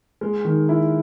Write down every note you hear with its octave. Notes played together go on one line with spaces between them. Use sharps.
G#3
D#3
E4